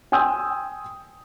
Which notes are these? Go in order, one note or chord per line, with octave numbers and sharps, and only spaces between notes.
G5 G#5 C6 D#6 E6 G6